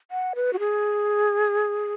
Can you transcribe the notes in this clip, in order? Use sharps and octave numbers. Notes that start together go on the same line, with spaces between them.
F#5
B4
F#4
G#4